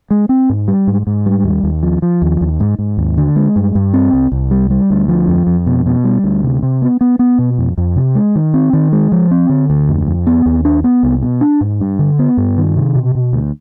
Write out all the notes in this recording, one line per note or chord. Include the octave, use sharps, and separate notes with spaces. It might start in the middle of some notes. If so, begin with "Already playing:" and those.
G#3
C4
G#2
G3
G#2
G#2
G3
D#2
D#2
F3
F3
D#2
D#2
G#2
G#2
D#2
D3
G#3
G2
G2
C4
C2
C2
G3
G3
D2
F3
F2
F2
B2
B2
G3
D2
C3
C3
B3
B3
B3
B2
F2
F2
C3
G#3
D#3
C4
D#3
G#3
F3
C4
D3
D2
F2
F2
B3
D#2
D4
B3
C2
B2
D4
G#2
G2
D3
B3
G2
D#3
C3
B2
B2
D2